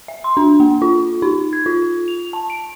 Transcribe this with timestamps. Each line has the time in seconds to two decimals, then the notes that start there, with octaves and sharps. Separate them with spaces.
0.08 E5
0.24 C6
0.37 D4
0.60 A#3
0.82 F4
1.22 D#4
1.53 G#6
1.66 F4
2.08 F7
2.33 A5
2.50 D7